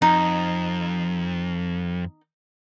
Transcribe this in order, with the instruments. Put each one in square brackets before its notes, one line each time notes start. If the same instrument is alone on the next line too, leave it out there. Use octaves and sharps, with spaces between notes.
[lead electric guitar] F2 [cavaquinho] D#4